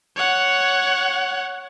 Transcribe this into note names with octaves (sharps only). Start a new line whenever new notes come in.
C#5 F#5